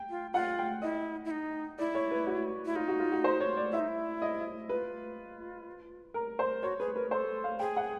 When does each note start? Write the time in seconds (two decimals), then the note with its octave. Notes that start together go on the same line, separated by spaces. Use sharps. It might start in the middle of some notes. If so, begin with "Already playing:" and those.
Already playing: G5
0.10 F4
0.33 F4 F#5
0.59 G5
0.82 E4 D#5
1.25 E4
1.31 D#4
1.79 E4 D5
1.95 C#5
2.11 B4
2.27 F#4
2.66 E4
2.76 D#4 F4
2.88 F#4
3.00 F4
3.12 F#4
3.24 C5
3.40 C#5
3.57 D5
3.72 E4 E5
3.79 D#4
3.88 E4
4.22 D#5
4.69 F4 B4
6.14 A#4
6.39 C5
6.62 F#4 C#5
6.79 G#4 B4
6.95 A#4 B4
7.11 A4 C5
7.44 F5
7.59 G#4 G5
7.77 F#5